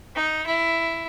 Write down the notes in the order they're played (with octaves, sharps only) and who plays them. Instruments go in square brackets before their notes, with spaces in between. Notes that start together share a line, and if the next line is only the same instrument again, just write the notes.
[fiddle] D#4
E4